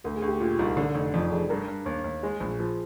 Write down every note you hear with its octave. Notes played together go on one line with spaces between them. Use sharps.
D2 A#4
G#4
D2
G4
A#2 F4
C2 D#4
D3 D4
F1 D#4
F2 D4
F1 G#4
G2 A#4
G2
D#2
D#2
G#3 G#4
A#1
F3